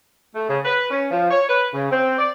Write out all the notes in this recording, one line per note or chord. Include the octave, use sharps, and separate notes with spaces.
A3
C#3
B4
C#4
F3
C#5
B4
C#3
C4
D5